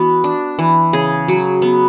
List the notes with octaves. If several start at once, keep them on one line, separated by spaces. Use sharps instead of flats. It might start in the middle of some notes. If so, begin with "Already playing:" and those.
Already playing: E3 B3 F#4
D4
E3
C#3 G#4
F#3
B3